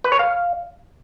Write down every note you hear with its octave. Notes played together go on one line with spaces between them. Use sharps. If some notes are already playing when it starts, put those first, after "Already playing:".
B4
C#5
F5